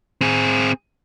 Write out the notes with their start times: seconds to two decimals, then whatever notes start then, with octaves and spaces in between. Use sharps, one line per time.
0.21 C4 G#4